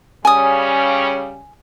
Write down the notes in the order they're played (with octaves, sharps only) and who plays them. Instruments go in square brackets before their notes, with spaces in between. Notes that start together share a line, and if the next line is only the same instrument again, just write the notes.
[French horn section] C#3 G3 C#4 [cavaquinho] G#5 D#6